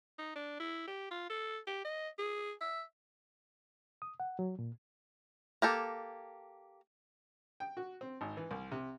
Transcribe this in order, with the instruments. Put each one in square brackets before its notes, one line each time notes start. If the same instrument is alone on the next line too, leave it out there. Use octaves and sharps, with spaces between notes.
[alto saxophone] D#4
D4
E4
G4
F4
A4
G4
D#5
G#4
E5
[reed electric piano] D#6
F#5
F#3
A#2
[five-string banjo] A#3 G4 A4
[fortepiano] G5
F#4
C4
G#1
E3
C2
C3